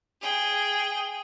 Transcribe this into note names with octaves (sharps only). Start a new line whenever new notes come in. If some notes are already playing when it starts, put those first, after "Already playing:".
G#4 G5